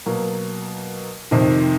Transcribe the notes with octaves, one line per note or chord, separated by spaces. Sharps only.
B2 F#3 A#3
F2 C3 D#3